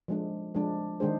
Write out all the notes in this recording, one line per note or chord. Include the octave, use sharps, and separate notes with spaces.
F3 G#3 D4
F3 G#3 D4
D#3 G#3 D4 G#4 C5